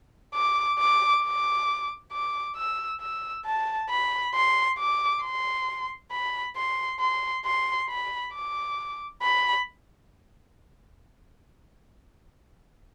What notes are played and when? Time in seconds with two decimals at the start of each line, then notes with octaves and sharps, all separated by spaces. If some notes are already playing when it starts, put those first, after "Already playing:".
0.34 D6
0.79 D6
1.24 D6
2.12 D6
2.57 E6
3.01 E6
3.46 A5
3.90 B5
4.34 C6
4.79 D6
5.22 C6
6.11 B5
6.56 C6
7.00 C6
7.45 C6
7.90 B5
8.33 D6
9.22 B5